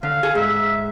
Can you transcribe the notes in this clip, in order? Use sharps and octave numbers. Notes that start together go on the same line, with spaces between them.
D3 F5
G#4 A4
G#2 E5